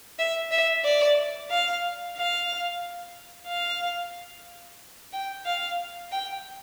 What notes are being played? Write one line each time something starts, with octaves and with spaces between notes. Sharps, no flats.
E5
E5
D5
F5
F5
F5
G5
F5
G5